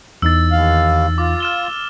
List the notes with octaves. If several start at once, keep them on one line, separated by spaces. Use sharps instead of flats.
E2 E3 D#4 E6 A6
D#2 F5
F4 D6
F6 E7 G7